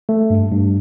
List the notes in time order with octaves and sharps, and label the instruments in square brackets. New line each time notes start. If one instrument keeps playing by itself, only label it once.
[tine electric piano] A3
G2
G2